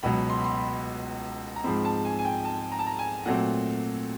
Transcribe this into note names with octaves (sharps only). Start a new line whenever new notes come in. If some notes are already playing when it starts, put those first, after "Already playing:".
C#2 B2 F#3 B5
C6
B5
C6
B5
A#5
G#2 F3 G#3 C4 B5
A5
G#5
G#5
G5
A5
A#5
A5
A#5
G#5
A#2 F#3 A3 C4 F#5